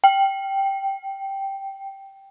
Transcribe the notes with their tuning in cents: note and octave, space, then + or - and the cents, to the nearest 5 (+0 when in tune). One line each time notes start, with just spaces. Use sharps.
G5 -5